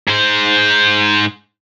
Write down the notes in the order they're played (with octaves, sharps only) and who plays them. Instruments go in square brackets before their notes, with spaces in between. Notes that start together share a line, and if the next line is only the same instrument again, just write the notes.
[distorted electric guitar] G#2 C5